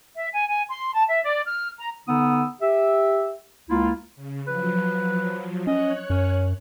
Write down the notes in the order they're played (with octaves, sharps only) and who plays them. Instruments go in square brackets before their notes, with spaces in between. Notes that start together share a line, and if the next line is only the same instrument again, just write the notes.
[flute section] E5
G#5
G#5
C6
A5
E5
D5
F6
A#5
[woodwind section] D3 B3 D#4 D#6 E6
G4 E5
C#2 A#3 E4 F4
[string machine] C#3
[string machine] F3 F#3 [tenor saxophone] B4
[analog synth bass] C#4 [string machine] C#5 F#6 [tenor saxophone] D#5
[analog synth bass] F#2 [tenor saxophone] C#4